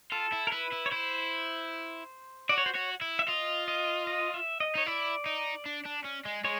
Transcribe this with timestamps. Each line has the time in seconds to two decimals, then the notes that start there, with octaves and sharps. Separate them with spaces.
0.12 F4 A4
0.32 E4
0.47 A#4
0.52 E4 B4
0.72 E4
0.86 C#5
0.91 E4 C5
2.49 F#4 D5
2.58 C#5
2.66 C5
2.74 F#4 C#5
3.02 E4
3.19 E5
3.28 F4 D#5
3.68 D#5
4.07 D#5
4.34 E5
4.60 D#5
4.75 D#4 C#5
4.86 E4 D5
5.26 D#4
5.66 D4
5.85 D4
6.04 C#4
6.25 G#3
6.44 G#3 C#5